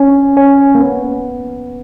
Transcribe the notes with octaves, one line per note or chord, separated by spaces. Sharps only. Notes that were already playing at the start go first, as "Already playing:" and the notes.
Already playing: C#4
C#4
A#3
B3